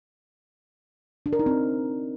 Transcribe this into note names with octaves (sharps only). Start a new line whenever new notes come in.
D4
A#4
D#4
C4